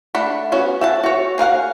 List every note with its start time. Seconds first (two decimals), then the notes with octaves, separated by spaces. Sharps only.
0.15 A3 D4 F#5 B5
0.52 B3 C#4 F#4
0.81 E5 F#5 A5
1.03 F#4 C#5
1.38 G#4 A#4 F5 F#5